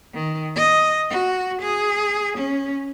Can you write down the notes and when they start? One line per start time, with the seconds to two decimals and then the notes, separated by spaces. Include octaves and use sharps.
0.14 D#3
0.56 D#5
1.11 F#4
1.62 G#4
2.38 C#4